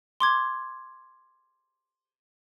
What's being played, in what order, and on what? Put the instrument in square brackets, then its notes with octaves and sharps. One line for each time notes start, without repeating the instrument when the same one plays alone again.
[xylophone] C6 D6 G#6